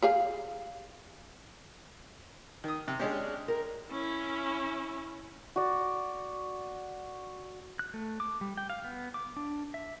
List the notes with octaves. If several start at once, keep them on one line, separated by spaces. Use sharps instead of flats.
G4 G#4 F5
D#3 D#6
C3
G#3 C#4 D4 G4 G#4
A#4
C#4 E4
F#4 D5
F#6
A3
D6
G3
G5
F5
B3
D6
D4
E5